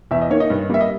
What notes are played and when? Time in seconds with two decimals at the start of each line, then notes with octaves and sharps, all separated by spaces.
0.11 E2 E5
0.21 D#5
0.30 D#3 A#3 C#5
0.40 D#4 D#5
0.50 G2
0.69 G3 A#3 E5
0.81 D#5